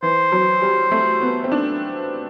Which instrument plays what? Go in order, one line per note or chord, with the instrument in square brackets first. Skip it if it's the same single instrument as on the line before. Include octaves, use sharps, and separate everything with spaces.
[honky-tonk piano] E3 [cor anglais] C5
[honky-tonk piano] F#3
G3
A3
B3
C4
D4